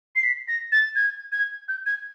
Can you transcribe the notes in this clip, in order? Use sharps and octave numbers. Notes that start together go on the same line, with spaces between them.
C7
B6
A#6
A6
G#6
G#6
G6
G#6